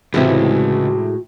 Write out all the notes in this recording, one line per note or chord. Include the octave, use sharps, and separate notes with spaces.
C#2 A2 C3 E3 G#3 C4 E4 F#4